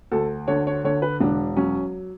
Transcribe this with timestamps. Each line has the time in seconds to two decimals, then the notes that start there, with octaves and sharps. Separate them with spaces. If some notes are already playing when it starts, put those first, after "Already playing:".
0.12 D2 A4
0.48 D3 C#5
0.67 C#5
0.84 D3 C#5
1.02 B4
1.20 E1 D4
1.57 F#3 C#4